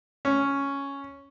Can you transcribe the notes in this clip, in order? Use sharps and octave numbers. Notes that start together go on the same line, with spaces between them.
C#4